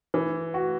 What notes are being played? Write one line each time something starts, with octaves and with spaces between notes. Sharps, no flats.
E3
F#4